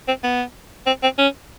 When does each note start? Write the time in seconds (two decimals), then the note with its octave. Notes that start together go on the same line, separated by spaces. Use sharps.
0.08 C4
0.24 B3
0.87 C4
1.03 C4
1.18 C#4